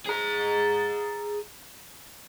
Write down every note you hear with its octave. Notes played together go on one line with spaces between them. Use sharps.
G#4 A#5